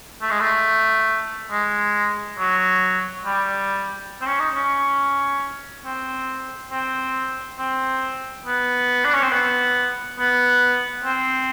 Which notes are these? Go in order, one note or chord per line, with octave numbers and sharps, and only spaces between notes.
A3
G#3
A3
G#3
F#3
G3
C4
C#4
D#4
C#4
C4
C4
C4
B3
D4
C#4
C4
B3
B3
C4